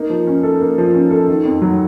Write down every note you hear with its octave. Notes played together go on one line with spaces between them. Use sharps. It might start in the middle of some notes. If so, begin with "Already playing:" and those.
Already playing: A#3 D#4
F3
C#4
A4
A#3
F3
C#4
A4
D#3
F2
F#3